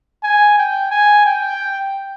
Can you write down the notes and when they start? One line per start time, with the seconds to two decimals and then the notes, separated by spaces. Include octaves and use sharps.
0.23 G#5
0.58 G5
0.91 G#5
1.26 G5